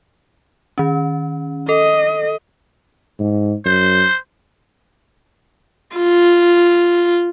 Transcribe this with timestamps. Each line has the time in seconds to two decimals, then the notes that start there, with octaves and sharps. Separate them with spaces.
0.78 D#3 C#4
1.69 A4 D#5
3.19 G#2
3.65 F#2 C5
5.96 F4